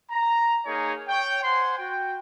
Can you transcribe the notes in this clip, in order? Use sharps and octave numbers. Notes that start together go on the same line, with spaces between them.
A#5
A#3 D#4 G#4 A#4 C#5 G#5
C#5 G5
C5 F#5 G#5 C6
F#4 G5